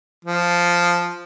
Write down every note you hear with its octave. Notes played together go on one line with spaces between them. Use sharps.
F3